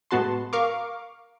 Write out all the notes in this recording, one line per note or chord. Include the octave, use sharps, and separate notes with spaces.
A2 G#3 B3 F#4 A5 C6
A#4 F5 C#6 D6